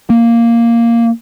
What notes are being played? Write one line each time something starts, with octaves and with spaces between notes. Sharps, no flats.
A#3